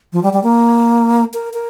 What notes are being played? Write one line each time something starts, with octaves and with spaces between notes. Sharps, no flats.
F3
G3
G3
A#3
A#4
A#4